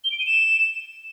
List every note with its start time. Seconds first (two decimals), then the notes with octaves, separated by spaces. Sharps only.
0.04 G7
0.12 D7
0.19 D#7
0.26 E7